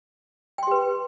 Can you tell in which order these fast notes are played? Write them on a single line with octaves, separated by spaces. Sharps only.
G5 C6 G4 B4